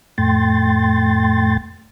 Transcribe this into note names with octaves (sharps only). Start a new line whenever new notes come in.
F2 A2 A3 G5 C6 A6